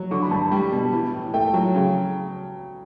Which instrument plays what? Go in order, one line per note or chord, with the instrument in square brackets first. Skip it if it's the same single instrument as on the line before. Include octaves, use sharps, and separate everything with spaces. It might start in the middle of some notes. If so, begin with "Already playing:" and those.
Already playing: [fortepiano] F#3
[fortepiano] D3 [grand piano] C#6
[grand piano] B5
[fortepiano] G2 [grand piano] A5
[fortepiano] G3
B2
E3
A2
[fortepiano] A3 [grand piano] G5
[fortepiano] F#3
C#3